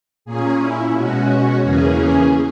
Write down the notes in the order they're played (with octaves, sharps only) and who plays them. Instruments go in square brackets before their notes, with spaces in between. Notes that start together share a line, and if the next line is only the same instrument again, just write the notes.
[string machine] A#2 A#3 C#4 G#4
E4
B2 G#3 C#4 F#4
E2 C#3 E3 A#3 C#4 G#4